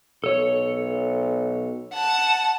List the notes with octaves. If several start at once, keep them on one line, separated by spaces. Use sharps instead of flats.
B1 A4 C#5
F#5 A5